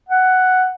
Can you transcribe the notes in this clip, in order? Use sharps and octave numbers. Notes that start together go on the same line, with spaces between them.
F#5